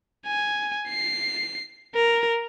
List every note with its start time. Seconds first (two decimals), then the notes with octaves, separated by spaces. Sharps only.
0.27 G#5
0.89 C7
1.95 A#4